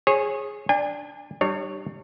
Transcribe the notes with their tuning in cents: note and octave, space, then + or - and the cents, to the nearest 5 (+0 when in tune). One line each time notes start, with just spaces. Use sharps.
G#4 +0 C#5 -30
D4 +0 G#5 -40
G3 -15 D4 +40 C#5 +0